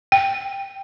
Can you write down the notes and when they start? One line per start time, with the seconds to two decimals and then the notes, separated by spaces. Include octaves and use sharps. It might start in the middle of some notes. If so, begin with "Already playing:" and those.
0.12 G5